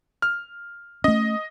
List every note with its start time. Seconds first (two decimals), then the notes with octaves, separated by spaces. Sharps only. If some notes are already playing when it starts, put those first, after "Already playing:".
0.22 F6
1.04 A3 C#4 D#5